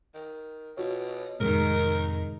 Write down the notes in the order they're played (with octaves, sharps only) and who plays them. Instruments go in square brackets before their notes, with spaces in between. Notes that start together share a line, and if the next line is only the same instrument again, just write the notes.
[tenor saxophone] D#3
[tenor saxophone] B2 [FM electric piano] F4 F#4 C#5
[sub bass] F2 [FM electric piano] A2 C3 G#3 [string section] D#3 D#4 [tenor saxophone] A#4